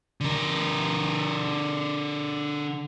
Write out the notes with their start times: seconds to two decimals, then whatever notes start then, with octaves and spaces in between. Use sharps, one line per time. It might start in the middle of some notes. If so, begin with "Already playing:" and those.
0.21 D3 A#4